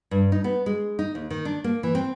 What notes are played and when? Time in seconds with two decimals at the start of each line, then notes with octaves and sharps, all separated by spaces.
0.11 G2
0.32 D#4
0.44 B3
0.66 G#3
0.99 D#4
1.15 D#2
1.30 D#3
1.45 D4
1.64 A#3
1.83 E3
1.95 C4